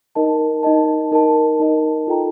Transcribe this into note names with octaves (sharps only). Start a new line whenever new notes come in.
D#4 A#4 D#5 A5
D#4 A#4 D#5 A5
D#4 A#4 D#5 A5
D#4 A#4 D#5 A5
F4 A4 D#5 G5 A#5